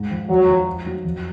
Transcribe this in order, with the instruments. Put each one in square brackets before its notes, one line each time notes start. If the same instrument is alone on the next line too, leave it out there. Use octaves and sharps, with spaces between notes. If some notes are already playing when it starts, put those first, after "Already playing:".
Already playing: [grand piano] G#2
F3
[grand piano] F2 [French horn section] F#3
[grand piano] F3
F4
F#3
F2